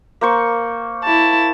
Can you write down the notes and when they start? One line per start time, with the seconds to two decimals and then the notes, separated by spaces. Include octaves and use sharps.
0.21 A#3 C5 C#6
1.04 E4 A5